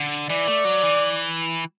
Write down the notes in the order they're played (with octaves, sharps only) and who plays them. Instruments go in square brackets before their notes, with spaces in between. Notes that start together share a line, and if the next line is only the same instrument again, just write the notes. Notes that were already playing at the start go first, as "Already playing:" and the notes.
Already playing: [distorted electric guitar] D3
[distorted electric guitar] E3 [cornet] D5
[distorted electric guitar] A3
F#3
E3